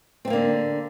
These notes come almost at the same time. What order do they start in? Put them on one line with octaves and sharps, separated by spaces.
C4 A3 A#3 D3